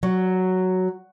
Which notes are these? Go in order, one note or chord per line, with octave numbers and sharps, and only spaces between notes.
F#3